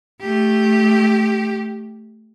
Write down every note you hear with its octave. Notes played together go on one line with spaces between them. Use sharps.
A3 G4